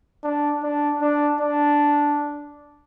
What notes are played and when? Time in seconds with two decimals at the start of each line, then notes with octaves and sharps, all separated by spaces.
0.24 D4
0.63 D4
1.02 D4
1.41 D4